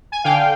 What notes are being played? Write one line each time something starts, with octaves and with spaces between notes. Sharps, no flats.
G#5
D3 F5 G5